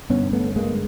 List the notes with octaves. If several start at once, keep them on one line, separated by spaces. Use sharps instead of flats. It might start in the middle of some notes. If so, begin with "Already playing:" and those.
G2 D3 B3 C#4
A3 B3
G#3 A#3